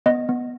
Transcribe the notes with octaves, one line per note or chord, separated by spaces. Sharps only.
B3 D#5
B3